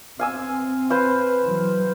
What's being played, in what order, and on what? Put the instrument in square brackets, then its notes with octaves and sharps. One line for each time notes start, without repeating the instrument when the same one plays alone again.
[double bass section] C4 [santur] F5 G#5 E6
[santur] B4 C5 F5
[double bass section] E3 F#3